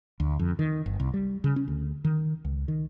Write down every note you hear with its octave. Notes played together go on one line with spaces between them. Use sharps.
D2
F2
D#3
G1
C2
G3
C#3
C#4
D2
D#3
C#2
D#3